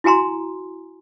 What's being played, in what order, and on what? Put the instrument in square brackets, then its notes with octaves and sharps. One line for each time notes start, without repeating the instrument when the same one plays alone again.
[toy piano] E4 F#4 G#5 A#5 C6